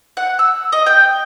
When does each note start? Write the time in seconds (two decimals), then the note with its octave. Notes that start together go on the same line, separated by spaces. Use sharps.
0.17 F#5
0.39 E6
0.72 D#5
0.86 G5